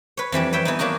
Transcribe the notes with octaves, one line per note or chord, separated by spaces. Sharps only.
B4 C#5
F2 E3 G3 D4
B4 C#5 E5 G5 A5
E3 B3 D#4
F#3 A#3 D4 D#4 F#4